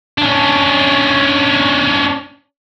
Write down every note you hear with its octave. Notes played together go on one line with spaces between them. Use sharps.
C#4 D4